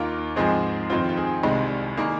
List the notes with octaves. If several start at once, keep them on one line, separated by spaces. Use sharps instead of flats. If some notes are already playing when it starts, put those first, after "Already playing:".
Already playing: D#2 D#3 A#3 F4 A#4
G#2 F3 G#3 C4 G#4
F2 D#3 C4 F4
F4
G#4
C2 C3 D#3 G#3 C4
D#3 A#3 G#4